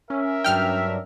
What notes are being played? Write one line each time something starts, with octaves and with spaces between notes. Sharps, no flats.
C#4 A#4 E5
G2 F#3 D4 G5 F6